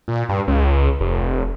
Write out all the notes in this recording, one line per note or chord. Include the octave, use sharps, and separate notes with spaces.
A#2
G2
C#2
F1